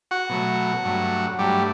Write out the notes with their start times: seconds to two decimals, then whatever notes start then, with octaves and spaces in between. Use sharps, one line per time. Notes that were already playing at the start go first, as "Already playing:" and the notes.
0.11 F#4 F#5
0.29 B2 F#3 A3
0.84 G2 F#3 A3
1.38 G2 F#3 G3 A3 G4